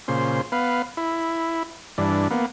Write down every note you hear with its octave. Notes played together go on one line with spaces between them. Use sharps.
A#2 C#3 C5
B3 B4 F5
E4
G2 E3 D4
A#3 B3